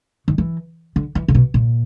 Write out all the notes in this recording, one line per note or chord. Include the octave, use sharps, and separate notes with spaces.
D#3
E3
D3
E3
C3
B2
A#2